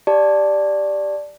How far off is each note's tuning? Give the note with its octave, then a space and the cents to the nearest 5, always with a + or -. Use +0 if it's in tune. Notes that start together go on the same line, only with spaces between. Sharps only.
G4 +0 D5 +0 A5 +0